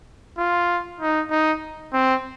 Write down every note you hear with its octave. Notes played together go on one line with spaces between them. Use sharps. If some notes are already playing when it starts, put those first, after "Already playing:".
F4
D#4
D#4
C4